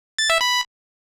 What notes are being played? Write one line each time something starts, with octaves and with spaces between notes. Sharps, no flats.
A6
E5
B5